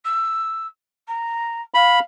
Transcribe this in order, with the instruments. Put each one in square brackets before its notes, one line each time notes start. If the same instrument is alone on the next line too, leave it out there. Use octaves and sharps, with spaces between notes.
[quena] E6
A#5
[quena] F5 [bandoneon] B5